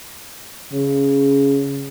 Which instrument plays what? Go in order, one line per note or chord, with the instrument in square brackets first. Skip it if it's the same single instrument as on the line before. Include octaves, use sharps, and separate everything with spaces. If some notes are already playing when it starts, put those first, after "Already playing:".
[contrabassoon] C#3